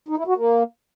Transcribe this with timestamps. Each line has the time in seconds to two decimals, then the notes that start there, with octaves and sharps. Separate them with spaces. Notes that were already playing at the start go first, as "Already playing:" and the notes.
0.08 D#4
0.18 E4
0.27 F#4
0.36 A#3